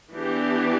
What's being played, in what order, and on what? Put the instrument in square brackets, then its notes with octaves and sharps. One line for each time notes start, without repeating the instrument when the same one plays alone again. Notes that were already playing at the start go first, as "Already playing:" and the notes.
[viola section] E3 B3 D4 G4